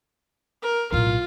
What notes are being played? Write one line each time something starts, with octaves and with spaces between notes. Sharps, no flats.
A#4
B1 A2 F4